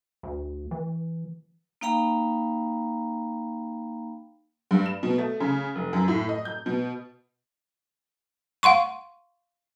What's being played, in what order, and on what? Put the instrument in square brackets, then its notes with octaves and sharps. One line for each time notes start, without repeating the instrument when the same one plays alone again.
[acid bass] D2
E3
[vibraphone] A#3 D#4 F5 G5 A#5 B5
[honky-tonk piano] G2
E7
B2
A3
C#3
F1
F#2
A2
D#5
G6
B2
[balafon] F5 F#5 C6 C#6